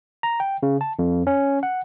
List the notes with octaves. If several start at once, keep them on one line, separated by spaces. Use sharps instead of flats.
A#5
G5
C#3
A5
F2
C#4
F#5